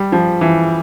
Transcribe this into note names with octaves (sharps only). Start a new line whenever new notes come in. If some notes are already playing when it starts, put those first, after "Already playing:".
Already playing: G3
F3
E3